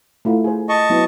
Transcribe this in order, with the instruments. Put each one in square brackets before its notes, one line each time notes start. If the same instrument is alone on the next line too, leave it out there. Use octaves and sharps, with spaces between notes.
[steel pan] A3 E4 F4
G#4 C5
[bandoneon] D#5 A5 C#6
[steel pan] F#3 B3 E4